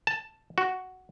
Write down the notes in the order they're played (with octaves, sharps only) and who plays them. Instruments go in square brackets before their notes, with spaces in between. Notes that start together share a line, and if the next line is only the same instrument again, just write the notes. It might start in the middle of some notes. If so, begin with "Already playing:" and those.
[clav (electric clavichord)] A5
F#4